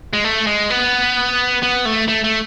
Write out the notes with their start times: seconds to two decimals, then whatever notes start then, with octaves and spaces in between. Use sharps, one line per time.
0.13 G#3
0.24 A3
0.47 G#3
0.70 B3
1.63 B3
1.85 A3
2.08 A3
2.24 A3